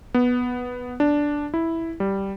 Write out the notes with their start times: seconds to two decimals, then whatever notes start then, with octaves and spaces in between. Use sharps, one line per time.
0.14 B3
1.00 D4
1.54 E4
2.00 G3